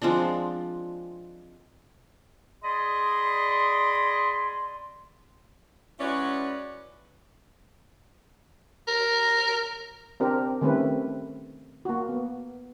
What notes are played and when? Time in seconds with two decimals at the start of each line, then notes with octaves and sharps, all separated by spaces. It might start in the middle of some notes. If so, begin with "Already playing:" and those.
0.02 F3 G#3 C4 D4
2.63 G#4 D5 D#5 B5 C6
6.00 G#3 C#4 E4 F#4 B4 D5
8.87 A#4
10.20 C4 D4 G4 A#4
10.61 D#3 G3 A3 C4 C#4 B4
11.85 A#3 F#4
12.09 B3